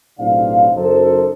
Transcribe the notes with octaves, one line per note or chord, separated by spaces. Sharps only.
B1 A2 C3 D4 F5
F#1 F#2 D#4 A4 C5